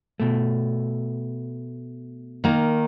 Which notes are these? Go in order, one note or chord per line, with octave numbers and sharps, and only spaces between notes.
B2 A3
D#3 A#3